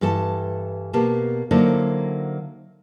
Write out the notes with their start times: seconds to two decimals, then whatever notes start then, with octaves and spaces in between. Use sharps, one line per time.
0.01 G2 E3 A4 A5
0.93 B2 A#3 G4 A5
1.51 D3 F#3 A#3 D#4 E4 C5